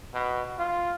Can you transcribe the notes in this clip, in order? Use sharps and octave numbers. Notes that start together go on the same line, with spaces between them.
B2
F4